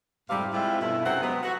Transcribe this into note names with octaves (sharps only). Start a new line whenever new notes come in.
F2 G#2 C3 G3 A3 F5
G3 G#3 C4 E4 F4
G2 B2 A3 E4
F#2 C3 C4 F#5
F3 F#3 G#3 B3
F#4